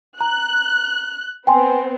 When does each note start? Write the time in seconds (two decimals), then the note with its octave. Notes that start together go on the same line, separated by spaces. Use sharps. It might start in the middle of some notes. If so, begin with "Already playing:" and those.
0.21 A#5 F#6
1.47 B3 C4 G5 G#5 C6